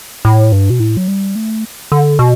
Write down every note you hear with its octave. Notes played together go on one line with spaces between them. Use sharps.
A2
G2
B2
A2
F#3
G3
A3
D3
B2